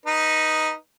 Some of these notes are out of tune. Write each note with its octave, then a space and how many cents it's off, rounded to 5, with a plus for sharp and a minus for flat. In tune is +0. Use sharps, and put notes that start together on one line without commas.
D#4 +0 B4 -25